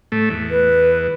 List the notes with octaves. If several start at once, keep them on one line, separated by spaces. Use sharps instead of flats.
A2 A3
E2
B4